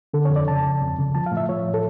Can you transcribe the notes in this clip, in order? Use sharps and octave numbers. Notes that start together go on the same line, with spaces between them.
D3 A4
C#5
F2
D5
C#3 A5
C#2
F2
C#3
F3 A5
F5
A2
E5
F3 C#5
A4